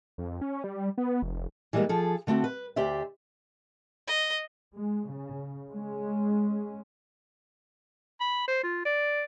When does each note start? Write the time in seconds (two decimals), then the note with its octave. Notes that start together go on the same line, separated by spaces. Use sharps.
0.18 F2
0.41 C#4
0.64 G3
0.98 B3
1.22 F1
1.73 E3 G3 G#3 A#3 B3
1.89 F3 G#4 A4
2.27 D3 A3 C4 F#4 F#5
2.44 B4
2.76 D2 G4 C5 D5 E5
4.08 D#5
4.76 G#3
5.11 C#3
5.73 G#3 C#4
8.21 B5
8.48 C5
8.63 F4
8.85 D5